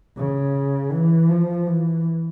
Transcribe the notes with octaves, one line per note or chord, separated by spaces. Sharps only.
C#3
E3
F3
E3